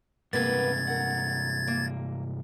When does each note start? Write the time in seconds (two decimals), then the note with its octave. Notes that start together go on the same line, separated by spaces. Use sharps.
0.33 G2 C3 G#3 A#3 B3 B4 G#6 A6
0.87 A#4 F#5
1.67 A#3